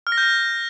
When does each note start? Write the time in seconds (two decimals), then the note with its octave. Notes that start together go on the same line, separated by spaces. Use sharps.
0.07 F6
0.12 A#6
0.18 G6
0.23 A#6